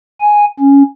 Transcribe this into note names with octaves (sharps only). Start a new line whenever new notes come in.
G#5
C#4